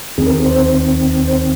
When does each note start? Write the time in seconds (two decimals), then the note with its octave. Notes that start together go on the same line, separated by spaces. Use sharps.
0.18 D#2 D#3 C4 G#4
0.26 A#4
0.35 G#4
0.45 C5
1.27 C5